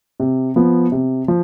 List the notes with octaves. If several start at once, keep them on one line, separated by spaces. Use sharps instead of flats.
C3
F3 B3
C3
F3